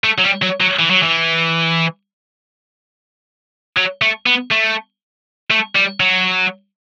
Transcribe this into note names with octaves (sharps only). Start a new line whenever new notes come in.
A3
F#3
G3
F#3
F#3
E3
F#3
E3
F#3
A3
B3
A3
A3
G3
F#3